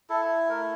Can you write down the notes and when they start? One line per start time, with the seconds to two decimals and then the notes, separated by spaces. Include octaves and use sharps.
0.09 E4 A4
0.49 A3 A#4